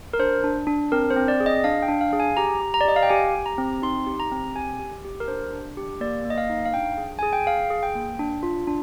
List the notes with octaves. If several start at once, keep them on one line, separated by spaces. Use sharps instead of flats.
A#4
D4 C5
D4
D4
C4 A#4
C5
C4
D5
G#4
D#5
D4 F5
G5
D4
F5
G#4
G#5
G4 A#5
G4
A#5
D5
G4 D#5
F5
G5
G4 G#5
G4
A#5
C4
D#4 C6
G4
A#5
C4
G4 G#5
G4
G4
A#4
D4 C5
D4
G4
A#3 D5
A#3
D#5
F5
D#4
F5
D4 G5
G#4
G#4 G#5
G5
G#4 F5
G#4
G5
A#3
D4
F4
D4